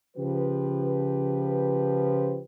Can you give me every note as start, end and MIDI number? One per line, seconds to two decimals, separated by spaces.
0.17 2.41 49
0.17 2.41 53
0.17 2.41 67
0.17 2.41 71